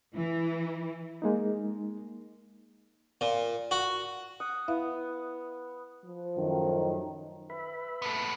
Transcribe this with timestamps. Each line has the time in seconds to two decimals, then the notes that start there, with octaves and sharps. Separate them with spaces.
0.14 E3
1.22 G#3 A#3 D#4
3.21 A#2
3.71 F#4
4.40 F#5 D#6
4.68 B3 E4 E5 F5
6.05 F3
6.37 F#2 A2 D#3
7.50 B4 E5 B5
8.02 A3 B3